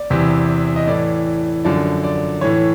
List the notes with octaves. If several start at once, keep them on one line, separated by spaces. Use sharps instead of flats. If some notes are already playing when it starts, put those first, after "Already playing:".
Already playing: D5
E2 C3 E3
D#5
A2 E3 D5
F#2 D3 F3 D5
D5
A2 E3 C#5